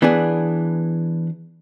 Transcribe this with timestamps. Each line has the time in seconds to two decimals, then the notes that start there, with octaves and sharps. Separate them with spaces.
0.02 E3 B3 D4 G#4